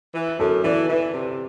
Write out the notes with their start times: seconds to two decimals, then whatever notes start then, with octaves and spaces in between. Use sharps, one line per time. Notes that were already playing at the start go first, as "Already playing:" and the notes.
0.15 E3
0.39 F#2 A4
0.64 E3 D5
0.89 E3
1.14 C3